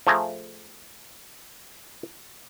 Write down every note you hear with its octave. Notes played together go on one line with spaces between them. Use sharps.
F3 A3 G#4 A#5